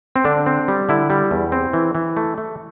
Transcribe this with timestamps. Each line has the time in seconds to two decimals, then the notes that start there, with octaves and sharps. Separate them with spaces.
0.16 C4
0.25 D3 D4
0.46 C4
0.68 G3
0.89 D3 E4
1.10 G3
1.31 E2
1.52 C4
1.73 E3
1.95 E3
2.17 A3
2.38 A3